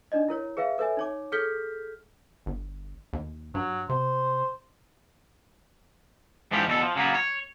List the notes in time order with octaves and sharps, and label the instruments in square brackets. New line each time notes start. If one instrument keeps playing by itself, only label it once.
[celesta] D4 D#4 D5 D#5
E4 A#4 C#5
G#4 B4 E5 F5
A4 B4 C#5 E5 G#5
D#4 C#5 D6
G#4 A4 F6 G6 B6 G7
[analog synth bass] G1
D#2
[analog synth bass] G2 [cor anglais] F#3
[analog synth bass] C3 [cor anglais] C5
[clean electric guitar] G#2 E3 F3 G3 G4
E2 B2 F#4 A4
F3
C#3 F#3 G#3 A#3 B3
C#5